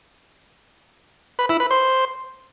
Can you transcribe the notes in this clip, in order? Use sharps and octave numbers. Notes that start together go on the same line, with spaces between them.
B4
E4
B4
C5